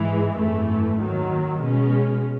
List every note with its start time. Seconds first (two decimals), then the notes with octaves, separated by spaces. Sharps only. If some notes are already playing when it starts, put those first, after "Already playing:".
Already playing: G#2 E3 G#3
0.36 G#1 F#2 E3 A3
0.98 D#2 D#3 F#3
1.60 B2 G#3 C#4